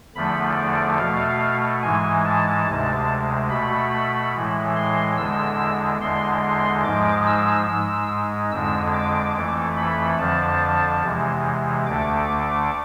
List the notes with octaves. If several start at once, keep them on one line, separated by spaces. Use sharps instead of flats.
E2 D3 F3 A3 B5
D5
B2 A3 F5
G#2 E3 G#3 G#5
A5
D2 C3 G#3
B2 A3 B5
A2 E3 G#3
C6
E2 D3 G#3 E6
E2 D3 G#3 C6
C6
G#2 F3 G#3 D6
E6
G#2 G#3
F2 D3 G#3 E6
D6
F2 E3 A3
B5
F2 D3 F3 A5
E2 C3 E3 G#3
D2 D3 A3 D6